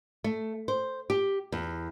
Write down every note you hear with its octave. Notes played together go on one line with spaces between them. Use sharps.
A3
C5
G4
E2